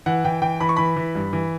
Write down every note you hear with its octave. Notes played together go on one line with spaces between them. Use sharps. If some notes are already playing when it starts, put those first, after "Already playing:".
E3 F#5
E3 G5
E3 G5
E3 B5
C#6
E3 B5
E3
G2
E3